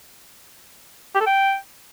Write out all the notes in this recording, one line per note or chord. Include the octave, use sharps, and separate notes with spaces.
G4
A4
G5